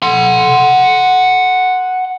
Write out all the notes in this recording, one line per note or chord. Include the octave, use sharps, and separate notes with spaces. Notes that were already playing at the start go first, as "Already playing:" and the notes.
F#5 C6